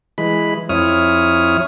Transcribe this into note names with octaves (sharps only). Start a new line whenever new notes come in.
E3 G#3 B5
F2 E4 C#5 D#6 F6